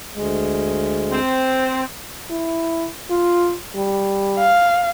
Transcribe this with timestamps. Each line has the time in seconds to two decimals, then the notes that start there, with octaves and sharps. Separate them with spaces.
0.15 D2 G#3
1.11 C4
2.31 E4
3.10 F4
3.76 G3
4.39 F5